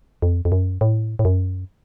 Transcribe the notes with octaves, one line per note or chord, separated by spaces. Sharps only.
F2
F2
F#2
A2
A2
F#2